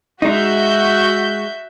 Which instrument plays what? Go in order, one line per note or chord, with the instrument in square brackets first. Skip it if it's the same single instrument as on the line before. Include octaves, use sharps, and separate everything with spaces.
[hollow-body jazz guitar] G#3 D#4 [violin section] F#4 E5 G6